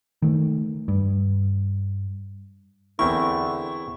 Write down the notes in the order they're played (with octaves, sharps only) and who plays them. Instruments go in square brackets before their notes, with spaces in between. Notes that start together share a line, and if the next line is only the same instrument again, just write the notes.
[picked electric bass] D#3 A3
G2
[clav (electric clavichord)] E2 C4 A#4 [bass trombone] D3 [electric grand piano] E4 [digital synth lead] C#6